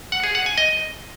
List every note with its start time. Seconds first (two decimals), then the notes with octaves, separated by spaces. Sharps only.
0.12 F#5
0.24 G#4
0.35 F#5
0.46 G#5
0.58 D#5